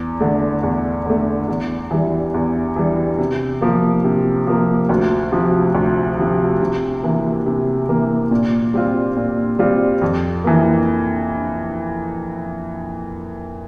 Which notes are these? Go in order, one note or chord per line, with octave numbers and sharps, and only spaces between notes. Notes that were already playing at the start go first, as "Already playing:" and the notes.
Already playing: E2
D3 A3
E2
D3 A3
E2
E3 G3
E2
E3 G3
C3
F3 A#3
C3
F3 A#3
D2
C3 F3
D2
C3 F3
C3
E3 A#3
C3
E3 A#3
A#2
G3 C4 F4
A#2
G3 C4 F4
F2
E3 A#3